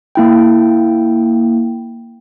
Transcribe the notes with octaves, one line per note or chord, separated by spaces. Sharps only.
A#3 E4 G5